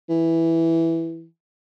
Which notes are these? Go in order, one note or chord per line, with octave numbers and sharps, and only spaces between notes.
E3